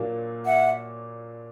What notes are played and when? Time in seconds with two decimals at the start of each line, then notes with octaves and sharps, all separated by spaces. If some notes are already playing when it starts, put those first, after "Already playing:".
Already playing: A#2 F#3 A#3 D4 F4
0.44 E5 F#5